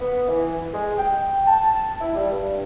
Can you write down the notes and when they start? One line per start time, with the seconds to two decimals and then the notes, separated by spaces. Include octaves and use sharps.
0.01 B3
0.28 E3
0.73 G#3
0.98 G5
1.47 A5
2.01 E4
2.15 G3
2.31 G2